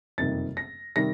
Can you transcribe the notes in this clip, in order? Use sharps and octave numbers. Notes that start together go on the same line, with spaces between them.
F#1 F2 C3 D#3 G3 A6
A#6
C3 D#3 G3 A#6